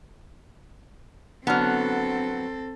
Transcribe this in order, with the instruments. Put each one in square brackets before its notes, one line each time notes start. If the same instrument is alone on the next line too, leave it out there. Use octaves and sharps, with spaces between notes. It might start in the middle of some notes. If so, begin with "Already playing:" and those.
[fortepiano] D3 A5 F6 [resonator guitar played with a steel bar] F#3 B3 [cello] C4 A4